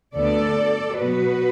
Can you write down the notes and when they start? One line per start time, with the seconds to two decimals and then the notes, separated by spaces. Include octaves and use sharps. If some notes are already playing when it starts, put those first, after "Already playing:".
0.16 D2 D3 B3 A4 D5
1.00 B2 F#3 B3 F#4 B4